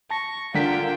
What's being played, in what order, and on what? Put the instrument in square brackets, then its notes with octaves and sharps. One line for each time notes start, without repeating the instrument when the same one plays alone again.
[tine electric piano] A5 A#6 [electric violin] C#6
[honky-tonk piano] D3 A#4 B6 [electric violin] D4 G5 [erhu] F4